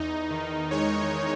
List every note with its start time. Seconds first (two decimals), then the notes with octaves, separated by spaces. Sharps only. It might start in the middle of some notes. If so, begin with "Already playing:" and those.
Already playing: E2 D#4
0.31 D#3
0.71 G#3 C#5
1.13 D#3